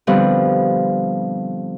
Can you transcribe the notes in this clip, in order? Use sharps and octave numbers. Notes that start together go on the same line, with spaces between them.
B2 D3 F3 G3 B3 C4